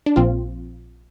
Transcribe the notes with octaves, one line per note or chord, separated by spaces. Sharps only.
D4
A#1 A#2 F3 C4 F4